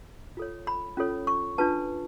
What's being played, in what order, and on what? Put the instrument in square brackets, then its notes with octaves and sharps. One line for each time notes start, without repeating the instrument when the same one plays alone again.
[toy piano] F4 A4 C#5
B5
C#4 F4 A4 C#5
C#6
D4 F4 B4 A5